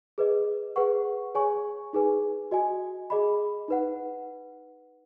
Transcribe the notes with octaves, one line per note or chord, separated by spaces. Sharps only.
G#4 B4 D#5
G#4 B4 F#5 C#6
G#4 C#5 G#5 C#6
D#4 G#4 B4 G#5
F#4 D#5 G#5
G#4 D#5 B5
D#4 B4 F#5